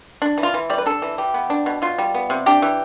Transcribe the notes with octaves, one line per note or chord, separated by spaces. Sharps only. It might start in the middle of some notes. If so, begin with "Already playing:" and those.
D4
E3
F4
E3
G3 D5
B4
D4 A4
E3
E3 G4
B3
D4
B2
B2 F4
G3
B3
C3
D4 G4
E3